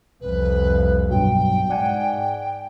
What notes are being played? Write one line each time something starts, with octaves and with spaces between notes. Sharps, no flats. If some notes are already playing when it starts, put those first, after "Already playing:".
C2 F2 B4
G2 B2 F#3 G5
G#2 D5 F#5 G#5